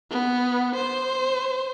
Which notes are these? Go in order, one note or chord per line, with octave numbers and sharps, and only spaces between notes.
B3
C5